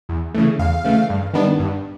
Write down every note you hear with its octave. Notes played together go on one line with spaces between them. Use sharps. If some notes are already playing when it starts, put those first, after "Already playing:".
E2
C#3 E3 A3
E2 F5
C#3 E3 A3
G2
D#3 G3 B3 D4
G2